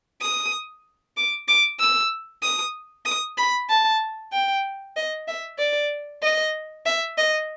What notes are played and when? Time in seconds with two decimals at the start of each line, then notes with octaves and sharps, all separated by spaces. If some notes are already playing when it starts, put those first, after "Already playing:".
0.21 D#6
1.17 D6
1.48 D6
1.80 E6
2.43 D#6
3.06 D#6
3.37 B5
3.69 A5
4.33 G5
4.96 D#5
5.28 E5
5.58 D5
6.22 D#5
6.86 E5
7.18 D#5